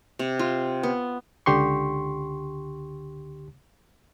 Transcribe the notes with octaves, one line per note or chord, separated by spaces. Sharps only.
C3
F4
B3
C#2 D3 G4 C6 C#6